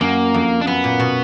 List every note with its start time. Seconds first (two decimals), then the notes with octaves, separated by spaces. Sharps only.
0.01 F#2 A#3
0.34 F2
0.61 D4
0.67 F#2 B3
0.84 A#2
1.00 B2